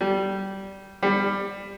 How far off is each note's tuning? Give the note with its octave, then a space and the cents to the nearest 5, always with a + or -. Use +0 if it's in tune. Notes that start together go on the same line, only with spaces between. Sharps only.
G3 -15
G3 +15